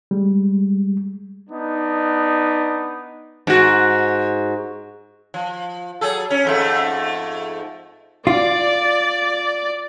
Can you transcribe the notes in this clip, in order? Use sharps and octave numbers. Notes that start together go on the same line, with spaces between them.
G3 G#3
B3 D4 D#4
G#2 F#4
F3
F#3 G#4 A4
C#4
F2 G#2 A3
F4 D5